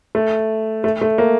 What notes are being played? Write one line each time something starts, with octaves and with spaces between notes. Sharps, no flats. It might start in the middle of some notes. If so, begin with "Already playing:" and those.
A3
A3
A3
A#3